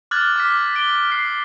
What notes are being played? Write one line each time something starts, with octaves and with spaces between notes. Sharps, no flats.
D6 F6 F#6 G#6 A6 F#7
D6 F6 B6
B6 D7 G7
F6 C7